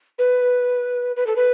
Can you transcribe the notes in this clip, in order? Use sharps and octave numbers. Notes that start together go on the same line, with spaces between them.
B4
B4
A4
B4